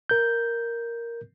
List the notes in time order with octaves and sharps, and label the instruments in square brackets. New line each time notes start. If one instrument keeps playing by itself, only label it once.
[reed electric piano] A#4 G6